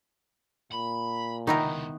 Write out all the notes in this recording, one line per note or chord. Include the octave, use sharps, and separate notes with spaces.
A#2 B5
C#2 C3 D#3 B3 D#4 E4 A#4